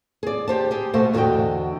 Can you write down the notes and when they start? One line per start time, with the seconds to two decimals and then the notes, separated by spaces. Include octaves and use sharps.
0.23 G#4 D5
0.48 G4 C5 A5
0.71 G4 G#4
0.94 B2 A3 A4 C5
1.14 E2 D3 F#4 B4 D#5 G5